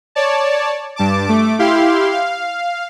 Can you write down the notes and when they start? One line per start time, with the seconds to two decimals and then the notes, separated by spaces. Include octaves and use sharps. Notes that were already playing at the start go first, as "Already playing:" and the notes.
0.15 C#5 D5 A5
0.96 G2 A5 D6
1.27 A3 D6
1.59 E4 G4 F5 C6
2.11 F5